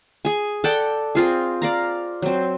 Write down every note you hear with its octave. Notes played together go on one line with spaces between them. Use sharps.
G#4 G#5
A4 D5 F#5 G5
C4 F4 G#4
D5 F5 A#5
F#3 C4